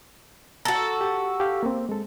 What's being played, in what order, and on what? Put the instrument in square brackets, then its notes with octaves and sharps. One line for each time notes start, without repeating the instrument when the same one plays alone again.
[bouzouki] F#4 A4 [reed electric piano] A#5
[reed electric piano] G4
G4 F5
A#3 C4
G#3 A4